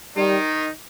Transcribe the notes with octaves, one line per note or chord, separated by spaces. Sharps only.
D#3 G3 D#4